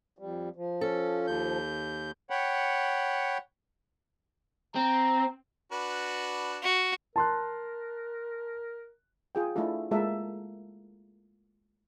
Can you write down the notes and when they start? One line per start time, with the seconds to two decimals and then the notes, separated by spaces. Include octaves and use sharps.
0.19 F2 G3
0.56 F3
0.81 C#4 A4
1.27 D#2 G6
2.30 C#5 F#5 G5 B5
4.76 C4 A#5
5.72 D4 F#4 B4
6.63 F#4
7.16 A#4 A5 C6 F#6
9.35 F4 G#4 G5
9.56 A3 D4 E4 F4 A4
9.91 G#3 A#3 F4 A4 A#4 E5